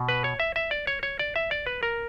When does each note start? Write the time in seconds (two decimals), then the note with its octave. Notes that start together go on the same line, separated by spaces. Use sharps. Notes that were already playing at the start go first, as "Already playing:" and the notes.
Already playing: B2
0.09 B4
0.24 C#5
0.40 E5
0.56 E5
0.71 D5
0.87 C#5
1.03 C#5
1.19 D5
1.36 E5
1.51 D5
1.67 B4
1.83 A#4